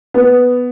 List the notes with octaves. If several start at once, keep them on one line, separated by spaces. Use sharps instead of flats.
B3